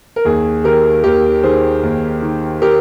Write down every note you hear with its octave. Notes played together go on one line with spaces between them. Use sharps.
A#4
D#2 G#4
D#3 G4 A#4
D#2 G4 A#4
D#3 G#4 C5
D#2
D#3
G4 A#4